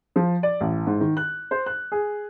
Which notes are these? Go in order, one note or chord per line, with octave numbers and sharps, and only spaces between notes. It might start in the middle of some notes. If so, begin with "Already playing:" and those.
F3
D5
A1
G#2
D#3
F#6
C5
F#6
G#4